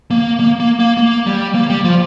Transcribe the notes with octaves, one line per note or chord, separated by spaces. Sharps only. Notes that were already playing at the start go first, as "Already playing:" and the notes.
A#3
A#3
A#3
A#3
A#3
G3
A#3
G3
F3